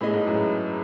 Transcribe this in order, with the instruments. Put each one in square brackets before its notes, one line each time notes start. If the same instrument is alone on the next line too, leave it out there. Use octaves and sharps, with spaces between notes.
[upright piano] A2 [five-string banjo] G#3 B3 E4 G#4 D#5
[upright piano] G#2
F#2 A2